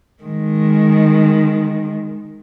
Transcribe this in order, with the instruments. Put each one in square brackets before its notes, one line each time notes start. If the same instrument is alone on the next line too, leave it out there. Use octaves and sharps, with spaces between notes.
[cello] D#3 G#3